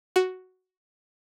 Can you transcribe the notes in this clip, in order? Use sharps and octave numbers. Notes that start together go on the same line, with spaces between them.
F#4